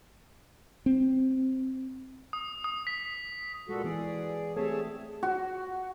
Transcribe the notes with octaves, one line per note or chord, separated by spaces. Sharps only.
C4
D#6
D#6
B6
A#2 G#3 F#4 A4
E3 B3 G#4 D5
A3 C4 G4 G#4 C#5 E5 A5
F#4